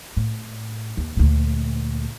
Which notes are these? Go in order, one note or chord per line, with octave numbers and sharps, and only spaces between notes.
A2
D#2
D2 A#2